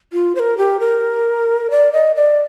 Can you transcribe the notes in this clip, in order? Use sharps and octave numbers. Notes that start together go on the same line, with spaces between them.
F4
C5
A#4
G4
A#4
D5
D#5
D5